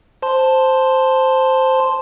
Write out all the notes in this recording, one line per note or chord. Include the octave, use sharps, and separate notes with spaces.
C5 A5 C6